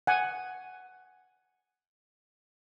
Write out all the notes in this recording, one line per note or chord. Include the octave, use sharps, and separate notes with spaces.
F#5 G#5